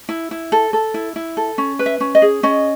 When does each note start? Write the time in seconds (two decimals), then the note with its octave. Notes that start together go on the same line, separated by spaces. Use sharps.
0.09 E4
0.31 E4
0.52 A4
0.73 A4
0.94 E4
1.16 E4
1.37 A4
1.58 C#4
1.79 B4
1.86 E5
2.00 C#4
2.15 D#5
2.22 G#4
2.43 C#4 D#5